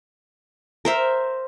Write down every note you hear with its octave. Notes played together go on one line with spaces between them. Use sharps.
A#4 C5 E5